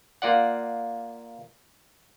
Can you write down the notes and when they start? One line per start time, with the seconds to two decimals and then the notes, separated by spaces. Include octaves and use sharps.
0.22 A#3 F4 D5 F#5